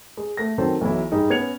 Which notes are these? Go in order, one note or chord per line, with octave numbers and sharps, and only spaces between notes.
G#3
A3 A#6
D#3 F#3 C4 A4 C5
B1 E3 F#3 E4
G#2 G3 G#3 D#4
B3 C#4 G#6 C#7 F7